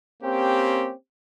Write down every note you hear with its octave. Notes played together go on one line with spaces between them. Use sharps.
A#3 C4 C#4 G4